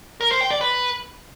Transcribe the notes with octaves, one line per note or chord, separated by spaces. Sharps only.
A#4
C5
G5
D5
B4